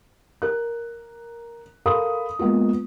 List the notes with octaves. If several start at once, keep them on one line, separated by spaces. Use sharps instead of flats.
A#4 F#6
A4 A#4 F5 B5 C6 D#6
G#3 A#3 B3 F4